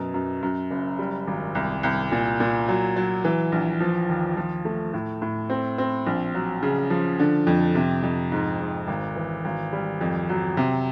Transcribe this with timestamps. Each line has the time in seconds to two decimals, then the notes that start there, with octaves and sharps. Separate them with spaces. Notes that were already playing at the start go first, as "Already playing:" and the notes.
Already playing: F#2 B2
0.14 F#2
0.43 F#2
0.71 F#1
0.99 G3
1.27 G#1
1.55 C2
1.83 C2
2.12 A#2
2.40 A#2
2.68 F#3
2.96 F#3
3.25 E3
3.52 A#1
3.80 F3
4.09 D#2
4.37 F3
4.65 A3
4.94 A2
5.22 A2
5.50 C4
5.78 C4
6.06 A#1
6.34 F#3
6.63 C#3
6.90 F3
7.19 D3
7.47 F2
7.75 C3
8.03 F2
8.32 G#2
8.60 G#2
8.88 G#1
9.16 E3
9.45 G#1
9.73 G3
10.01 F2
10.29 F#3
10.57 C3